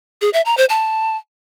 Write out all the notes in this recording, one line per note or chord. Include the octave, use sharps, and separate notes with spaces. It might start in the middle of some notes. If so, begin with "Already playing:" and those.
G#4
E5
A#5
C5
A5